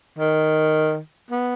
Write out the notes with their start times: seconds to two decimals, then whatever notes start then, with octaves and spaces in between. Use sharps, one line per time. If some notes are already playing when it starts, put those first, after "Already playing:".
0.19 D#3
1.30 B3